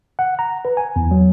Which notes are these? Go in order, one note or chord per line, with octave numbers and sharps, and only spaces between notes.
F#5
A#5
B4
G#5
E2
F#3